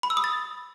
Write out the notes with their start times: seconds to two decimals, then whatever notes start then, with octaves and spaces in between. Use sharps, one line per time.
0.03 B5
0.10 E6
0.17 D#6
0.24 A6